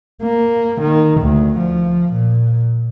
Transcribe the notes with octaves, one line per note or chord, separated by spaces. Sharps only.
A#3
D#3
D2
F3
A#2